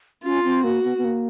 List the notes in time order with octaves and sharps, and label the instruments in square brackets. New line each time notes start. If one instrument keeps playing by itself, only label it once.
[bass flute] C#4 [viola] F4
[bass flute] C4
[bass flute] A#3 [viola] F#4
[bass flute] B3
B3
A#3